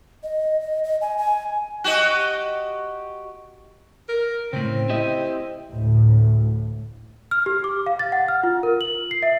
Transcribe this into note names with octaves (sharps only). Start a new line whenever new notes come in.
D#5
D#5
D#5
G#5
G#5
F#4 G4 D#5
A#4
A2 C#3 C4
E4 G4 D#5
D2 A2
F6
G4
D6
F5
A6
F#5
F6
F4
A#4
F#7
C7
E5